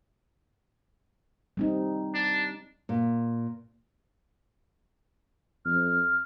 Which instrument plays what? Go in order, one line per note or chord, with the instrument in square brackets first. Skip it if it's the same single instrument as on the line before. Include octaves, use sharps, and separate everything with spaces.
[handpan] G3 C4 D#4
[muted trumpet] D4
[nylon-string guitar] A#2
[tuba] F2 [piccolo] F6